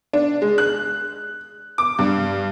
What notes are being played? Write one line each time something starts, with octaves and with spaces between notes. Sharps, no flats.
D4
G#3
F#6
D6
G2